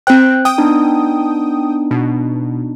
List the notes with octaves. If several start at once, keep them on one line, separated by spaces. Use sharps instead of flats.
C4 C5 G5 F#6
G5 D#6
B3 D4 D#4
B2